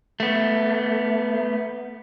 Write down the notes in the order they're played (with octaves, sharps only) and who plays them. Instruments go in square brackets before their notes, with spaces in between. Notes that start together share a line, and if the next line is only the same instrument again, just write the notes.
[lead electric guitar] A3 B3